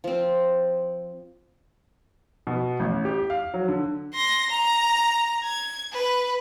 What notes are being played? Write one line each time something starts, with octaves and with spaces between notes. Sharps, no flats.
F3 C4
B2
A1
G4
F5
F#3
D3
C6 A#6
A#5
G#6
B4